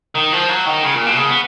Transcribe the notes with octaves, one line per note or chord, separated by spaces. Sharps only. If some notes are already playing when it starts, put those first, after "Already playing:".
D#3
F3
F#3
D#3
C#3
A#2
B2
C#3
B3